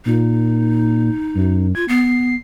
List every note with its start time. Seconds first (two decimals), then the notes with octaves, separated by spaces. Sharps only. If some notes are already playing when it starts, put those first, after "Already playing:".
0.05 A#2 D#4
1.35 F#2
1.75 F4 G#6
1.88 B3 C7